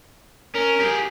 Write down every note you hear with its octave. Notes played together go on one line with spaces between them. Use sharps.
C#4 A#4
G4 G#4